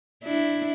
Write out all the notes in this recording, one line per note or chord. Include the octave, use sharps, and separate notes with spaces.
D4 E4